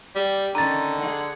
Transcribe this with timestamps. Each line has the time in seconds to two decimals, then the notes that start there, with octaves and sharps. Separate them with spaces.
0.16 G3 G4
0.55 D3 D#3 C#4 A#5 A6
1.02 G#4 F#5